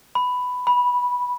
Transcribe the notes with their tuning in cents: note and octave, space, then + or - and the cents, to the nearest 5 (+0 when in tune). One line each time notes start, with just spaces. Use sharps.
B5 +10
B5 -10